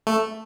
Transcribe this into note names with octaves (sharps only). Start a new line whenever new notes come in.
A3